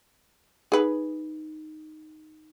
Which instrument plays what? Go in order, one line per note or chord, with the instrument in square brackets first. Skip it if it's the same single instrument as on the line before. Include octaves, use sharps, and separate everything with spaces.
[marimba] D#4 [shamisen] G#4 B4